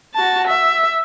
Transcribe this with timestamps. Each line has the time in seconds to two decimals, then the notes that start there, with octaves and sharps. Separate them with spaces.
0.15 F#4 A5
0.47 E5